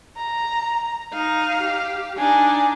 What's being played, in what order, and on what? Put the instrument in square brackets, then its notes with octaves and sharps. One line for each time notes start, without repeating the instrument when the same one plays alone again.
[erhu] A#5
[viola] D#4 [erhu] F5
[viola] G4
[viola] D4 D#4 [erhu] G#5